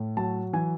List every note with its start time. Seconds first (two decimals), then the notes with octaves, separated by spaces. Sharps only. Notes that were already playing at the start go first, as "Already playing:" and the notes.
Already playing: A2
0.17 F#3 A5
0.53 E3 G#5